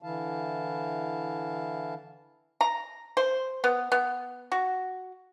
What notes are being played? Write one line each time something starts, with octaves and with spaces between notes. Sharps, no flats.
D3 E3 E4 F5 A5
A#5
C5
B3
B3
F#4